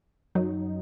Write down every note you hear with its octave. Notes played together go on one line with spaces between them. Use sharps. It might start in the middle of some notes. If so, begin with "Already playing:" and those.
F#2 F#3 D#4